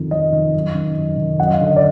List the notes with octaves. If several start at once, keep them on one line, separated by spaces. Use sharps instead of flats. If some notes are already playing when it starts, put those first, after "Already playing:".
Already playing: F2 D#3
F2 D#5
D#3
F#2
D#3
F#2
D#3
F#2 F#5
D#5
F5
D3
D#5
D5